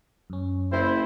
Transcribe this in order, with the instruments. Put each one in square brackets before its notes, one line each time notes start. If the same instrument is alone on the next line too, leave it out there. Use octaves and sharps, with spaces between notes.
[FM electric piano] F#2 C#4
[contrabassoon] F#1 [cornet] E4 [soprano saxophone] C5